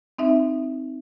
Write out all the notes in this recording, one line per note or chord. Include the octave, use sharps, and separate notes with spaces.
C4 D#4 E5